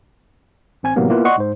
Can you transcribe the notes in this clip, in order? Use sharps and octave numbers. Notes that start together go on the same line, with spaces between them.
A1 C4 G#5 G#6
A2 C3 E3 F#3 A#3 B3
A#3 B3 E4 F4 B4
D5 D#5 F#5 C6 C#6
G#2 C5